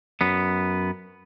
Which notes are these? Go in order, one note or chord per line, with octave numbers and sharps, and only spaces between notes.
F#2 B3